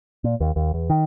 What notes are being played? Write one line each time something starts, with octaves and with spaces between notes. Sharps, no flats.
A#2
D#2
D#2
E2
D#3